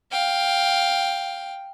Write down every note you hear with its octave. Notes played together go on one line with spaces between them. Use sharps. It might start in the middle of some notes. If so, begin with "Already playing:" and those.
F5 G5